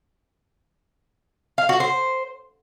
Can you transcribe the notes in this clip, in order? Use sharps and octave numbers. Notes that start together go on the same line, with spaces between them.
F5
F#4
C5